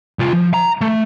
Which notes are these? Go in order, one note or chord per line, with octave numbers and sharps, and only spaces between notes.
C2 F4
F3
A#5
A3